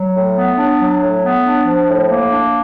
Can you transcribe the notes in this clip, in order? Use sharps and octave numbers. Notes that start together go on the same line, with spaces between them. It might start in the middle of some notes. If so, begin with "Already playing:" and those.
Already playing: F#3
A2
B3
D4
F#3
A2
B3
D4
F3
A2
A#3
D4